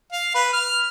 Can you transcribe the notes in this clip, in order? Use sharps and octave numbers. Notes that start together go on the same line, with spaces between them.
F5
B4
F6